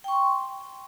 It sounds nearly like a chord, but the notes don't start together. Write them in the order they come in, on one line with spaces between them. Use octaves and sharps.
G5 C#6 C6